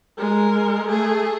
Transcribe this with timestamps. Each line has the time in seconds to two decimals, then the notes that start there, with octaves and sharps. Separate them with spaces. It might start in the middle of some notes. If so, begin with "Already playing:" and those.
0.18 G#3 A#4
0.86 A3 G#4